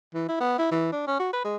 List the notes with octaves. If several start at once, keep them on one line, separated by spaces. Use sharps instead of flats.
E3
E4
B3
E4
E3
D4
C#4
F#4
B4
G#3